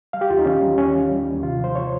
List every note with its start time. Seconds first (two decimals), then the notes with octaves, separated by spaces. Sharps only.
0.13 G3 F5
0.21 G4
0.30 D#2 F4
0.39 D#4
0.45 D#3 C#4
0.62 G3
0.78 D#2 C#4
0.95 D#3
1.10 G3
1.27 D#2
1.43 C3 F4
1.59 F3
1.64 C5
1.75 F3 C#5